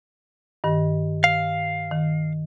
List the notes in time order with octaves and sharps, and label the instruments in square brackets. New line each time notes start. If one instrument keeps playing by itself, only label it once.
[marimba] G2 D#3
[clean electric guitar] F5
[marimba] D#3